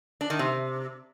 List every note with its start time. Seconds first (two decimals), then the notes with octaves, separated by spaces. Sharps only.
0.21 D4
0.30 D#3
0.39 C3